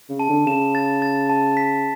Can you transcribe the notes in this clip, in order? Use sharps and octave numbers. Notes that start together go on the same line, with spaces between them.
C#3
A5
D3
C#3 E7
A6
A6
A5
B6